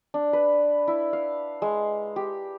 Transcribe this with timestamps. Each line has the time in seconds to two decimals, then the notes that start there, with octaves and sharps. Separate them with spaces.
0.14 D4
0.33 B4
0.88 E4
1.13 F5
1.62 G#3
2.16 G4